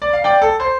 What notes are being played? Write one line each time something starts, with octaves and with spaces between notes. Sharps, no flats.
D5
F5
D5 G5
A4
C5